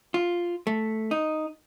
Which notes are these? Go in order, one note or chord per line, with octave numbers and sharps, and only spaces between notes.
F4
A3
D#4